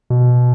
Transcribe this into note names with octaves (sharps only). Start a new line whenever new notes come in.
B2